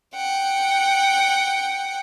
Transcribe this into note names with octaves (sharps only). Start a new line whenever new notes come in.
F#5 G5